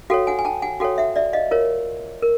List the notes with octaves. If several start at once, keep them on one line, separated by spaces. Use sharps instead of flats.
F#4 A4 C#5 F5 G5
F#5 G#5
G#5
G5 A5
F#5 G#5
F#4 A4 C#5 F5 G5
E5 F#5
D5 E5
D#5 F5
F4 A#4 C#5
A#4